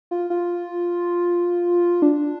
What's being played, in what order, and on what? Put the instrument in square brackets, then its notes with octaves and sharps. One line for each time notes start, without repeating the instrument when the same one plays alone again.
[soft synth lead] F4
F4
D4